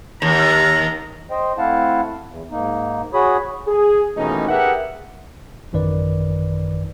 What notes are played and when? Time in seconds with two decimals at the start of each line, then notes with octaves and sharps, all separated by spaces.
0.22 D#2 A#5
1.30 C5 D#5 G5
1.58 A3 C4 E4 F5 F#5 A5
2.27 E2
2.51 G#2 A#3 D#4
3.14 F#4 G#4 C#5 B5 D#6
3.68 G#4
4.17 D#2 B2 E3 A3 C#4 D#4
4.48 G4 G#4 A#4 B4 E5 F#5
5.73 A1 F#2 D#3 B4 D5